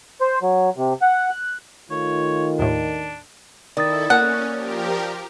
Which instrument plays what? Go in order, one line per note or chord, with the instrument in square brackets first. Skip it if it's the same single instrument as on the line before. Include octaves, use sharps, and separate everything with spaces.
[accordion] C5
F#3
C3
F#5
F#6
[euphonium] D#3 [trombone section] A3 F4 [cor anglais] C#5
[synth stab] D#2 A2 [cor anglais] D4
[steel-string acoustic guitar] D#3 [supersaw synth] E4 A4 [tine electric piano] D5 D#6 A6
[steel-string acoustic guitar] A#3 [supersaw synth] C#4 [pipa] F#5
[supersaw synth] F3 G4 A#4